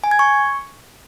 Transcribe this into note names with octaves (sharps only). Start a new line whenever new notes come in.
G#5
G#6
C#6